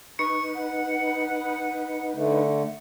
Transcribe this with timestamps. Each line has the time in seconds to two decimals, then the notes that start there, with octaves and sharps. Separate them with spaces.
0.19 D#4 B4 C#6 C#7
0.55 F#5
2.15 D3 A3